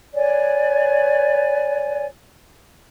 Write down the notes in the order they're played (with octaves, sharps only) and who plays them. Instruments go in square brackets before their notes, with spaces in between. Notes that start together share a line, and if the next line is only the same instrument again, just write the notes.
[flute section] B4 C#5 D5 G#5